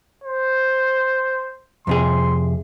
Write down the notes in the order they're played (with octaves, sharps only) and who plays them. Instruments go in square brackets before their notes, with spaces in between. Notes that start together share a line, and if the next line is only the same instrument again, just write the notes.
[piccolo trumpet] C5
[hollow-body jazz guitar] F2 C3 G#4 [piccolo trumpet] C6